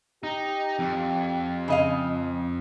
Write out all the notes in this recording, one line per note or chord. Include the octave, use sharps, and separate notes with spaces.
D#4 G4
F2
C#3 D#5 F5